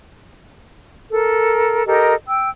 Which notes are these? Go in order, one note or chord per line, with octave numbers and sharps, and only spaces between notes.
A4 A#4
G4 A4 A#4 D#5
G5 E6